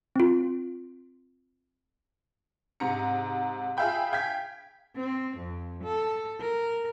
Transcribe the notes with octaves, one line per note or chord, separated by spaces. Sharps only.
C4 F4
G#2 C3 A#5 C#7
F4 G#4 E5 F5 G5 B5
F5 G5 G#6 B6
C4
F2
A4
A#4